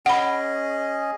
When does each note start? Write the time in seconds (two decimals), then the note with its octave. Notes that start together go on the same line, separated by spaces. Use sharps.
0.06 C#4 G#4 D#5 F#5 B5